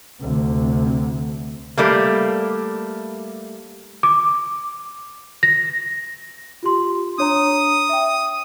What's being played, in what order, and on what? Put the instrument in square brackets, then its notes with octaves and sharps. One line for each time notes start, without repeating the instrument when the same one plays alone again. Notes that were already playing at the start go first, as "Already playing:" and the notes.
[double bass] D2 C3
[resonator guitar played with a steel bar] G3 A3 A#3
[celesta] D6
A#6
F4 G4 C6
[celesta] D4 C#5 A#5 [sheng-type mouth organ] D#6
[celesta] E5 G5